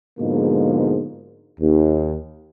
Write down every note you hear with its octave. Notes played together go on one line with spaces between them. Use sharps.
G#2 B2 D3 F3 G#3 A#3
D#2